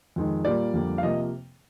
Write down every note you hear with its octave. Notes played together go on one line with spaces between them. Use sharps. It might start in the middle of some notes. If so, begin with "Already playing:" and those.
F2 D#3 G#3
A#2 G3 A#3 D5
F2 D3 G3 A#3
F5
C3 F3 A#3 D#5